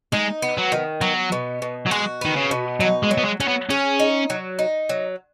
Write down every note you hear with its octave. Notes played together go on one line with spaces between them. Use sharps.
G#3 D#4
B3
F#3
D#3
F#3 B3
B2
B2
F#3
G#3 F#4
D#3 B3
C#3
B2
F#3 D#4
G#3
F#3
B3
G#3
F#3 C#4
B3
C#4 G#4
D#4
F#3
D#4
F#3